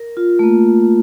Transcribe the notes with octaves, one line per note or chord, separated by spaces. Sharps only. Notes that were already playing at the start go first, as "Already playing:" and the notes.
Already playing: A#4
F4
A3
A#3